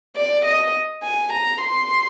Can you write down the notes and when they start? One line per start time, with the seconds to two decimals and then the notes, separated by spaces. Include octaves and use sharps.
0.16 D5
0.45 D#5
1.03 G#5
1.33 A#5
1.61 C6